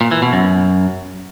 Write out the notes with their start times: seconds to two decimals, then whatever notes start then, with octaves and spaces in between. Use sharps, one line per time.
0.01 A#2
0.11 E3
0.22 B2
0.33 F#2